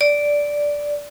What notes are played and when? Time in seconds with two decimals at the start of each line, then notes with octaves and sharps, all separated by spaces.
0.01 D5